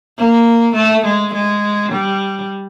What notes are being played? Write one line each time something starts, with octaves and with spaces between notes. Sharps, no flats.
A#3
A3
G#3
G#3
G3